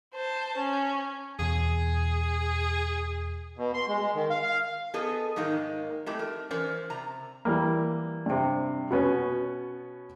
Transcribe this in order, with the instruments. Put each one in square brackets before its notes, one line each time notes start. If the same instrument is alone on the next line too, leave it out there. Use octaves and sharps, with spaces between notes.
[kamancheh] C5 A5
C#4
[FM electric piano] E2 B2 [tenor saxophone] G#4
[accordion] B2
C6
G#3
G#3
D#3
F5
F5
[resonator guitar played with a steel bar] B3 G#4 A4 D#5
G#2 D#3 G#3 A#3 D#4
G#3 A3 C4 E4 G4
A#4
E3 C#4 A#4 C5 D5
C3 A#5
[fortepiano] E3 G3 A#3
G2 C3
B2 B3 C#4